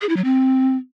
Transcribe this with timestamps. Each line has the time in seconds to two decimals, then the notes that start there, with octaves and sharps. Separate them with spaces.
0.01 G#4
0.09 E4
0.17 F#3
0.24 C4